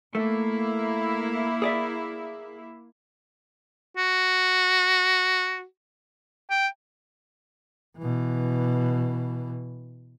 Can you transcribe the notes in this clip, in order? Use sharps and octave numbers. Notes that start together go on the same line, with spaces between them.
A3 A#3 E4
G#4 D5 E5
F#4
G5
B2 E3